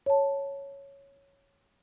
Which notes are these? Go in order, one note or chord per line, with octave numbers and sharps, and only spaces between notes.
C#5 A5